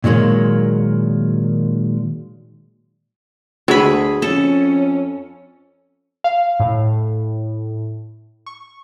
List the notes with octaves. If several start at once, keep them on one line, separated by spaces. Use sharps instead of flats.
A#2 D#3 F#3 G#3 A#3
D2 F#3 G#3 G#4 B5
F2 C#4 A4
F5
A2
C#6